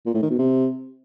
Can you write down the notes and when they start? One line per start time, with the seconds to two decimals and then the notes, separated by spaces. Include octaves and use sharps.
0.06 A#2
0.14 A2
0.22 D#3
0.31 B2
0.39 C3